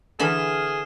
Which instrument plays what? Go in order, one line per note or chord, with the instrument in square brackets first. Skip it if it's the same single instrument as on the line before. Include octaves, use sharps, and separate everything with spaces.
[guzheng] D3 E3 B5 [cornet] G#4 [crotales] F6 E7